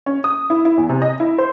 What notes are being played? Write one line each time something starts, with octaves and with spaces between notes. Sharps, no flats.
C#4
D#6
E4
E4
E2
C3
D#5
E4
C5